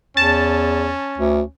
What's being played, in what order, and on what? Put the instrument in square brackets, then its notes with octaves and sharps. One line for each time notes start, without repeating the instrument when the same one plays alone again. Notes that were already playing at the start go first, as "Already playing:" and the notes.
[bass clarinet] E2 [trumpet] C#4 [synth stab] A5
[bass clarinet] D2